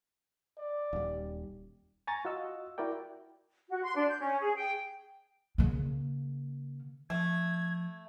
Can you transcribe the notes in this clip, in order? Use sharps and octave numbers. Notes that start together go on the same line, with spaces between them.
D5
D#1 G3
G#5 A#5 C#6 A6
F4 F#4 D#5 E6
E4 F#4 A#4 D5 G5
F#4
C6
D4
G6
C#4
G#4
G5
C#3 A#3
F3 A3 G#6